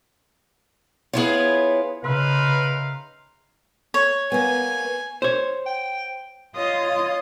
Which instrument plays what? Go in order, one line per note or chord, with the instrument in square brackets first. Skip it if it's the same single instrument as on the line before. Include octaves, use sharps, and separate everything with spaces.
[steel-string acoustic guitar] B3 E4 F4 [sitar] G#4 C#5
[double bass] C#3 [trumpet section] D#4 A#4 F5 [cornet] B4 [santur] E5 C6
[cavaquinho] C#5
[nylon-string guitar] A#3 B3 [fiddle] G#5
[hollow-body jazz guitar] C5 C#5
[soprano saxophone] G5
[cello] F4 [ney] C#5 [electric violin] D#5